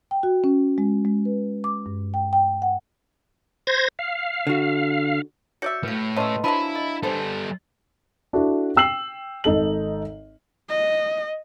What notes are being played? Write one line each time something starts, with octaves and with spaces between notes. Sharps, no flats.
G5
F#4
C#4
G#3
G#3
B4
D6
G2
G5
G5
F#5
C5 G#6 A#6
F5
D3 F#4
F#4 C#5 D5 E5 G6 C#7
A2 B4 F5
A3 C#4 B4 D#5 F5 A5 C6
F3 F#3 A#3 D4 E4 F5 A5 B5
D#5
G3 B3 A4 C5
D4 E4 F#4 A4
G5 E6 C7 F#7
G#1 D#4 A4 F#7
D#5